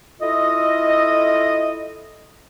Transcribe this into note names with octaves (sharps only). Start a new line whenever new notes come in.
E4 F4 A4 D#5